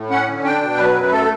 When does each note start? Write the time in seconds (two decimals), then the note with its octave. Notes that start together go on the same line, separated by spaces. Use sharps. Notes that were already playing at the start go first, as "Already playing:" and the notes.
Already playing: A2
0.10 C#4 F#5
0.28 D3
0.44 D4 G5
0.61 B2
0.78 F#3 B4
0.94 F#2
1.11 A3 A4